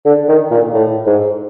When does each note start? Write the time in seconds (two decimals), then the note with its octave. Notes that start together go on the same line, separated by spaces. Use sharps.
0.05 D3
0.29 D#3
0.51 A#2
0.73 A2
1.07 G#2